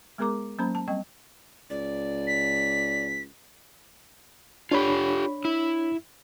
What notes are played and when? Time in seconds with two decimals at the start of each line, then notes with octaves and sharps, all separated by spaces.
0.18 G#3 B3 G#4 A#4 A#5 D6
0.58 F#3 A#3 C#4 C5 A#5 B5
0.75 A5
0.88 G3 C4 D#5 G5 C#6
1.70 C#2 D5
2.27 B6
4.72 D4 F4 G4 C#5 B5
5.45 E4